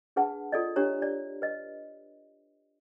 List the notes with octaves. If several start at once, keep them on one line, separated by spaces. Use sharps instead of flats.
D4 G#4 B4 F#5 A5
F4 A4 D5 D#5
D4 G4 C#5 A#5
D5
B4 D#5